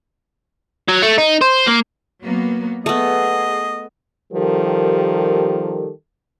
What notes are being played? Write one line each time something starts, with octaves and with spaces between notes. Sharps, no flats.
F#3
A3
D#4
C5
A#3
F#3 A#3 B3
A3 B3 G#4 D#5
D#3 F3 G3 G4 A4 A#4